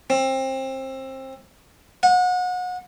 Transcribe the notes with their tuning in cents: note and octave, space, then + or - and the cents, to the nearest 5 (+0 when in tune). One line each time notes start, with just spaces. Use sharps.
C4 +25
F#5 -30